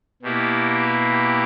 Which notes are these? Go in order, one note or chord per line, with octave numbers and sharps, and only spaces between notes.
B2 A#3 E4 G4
G4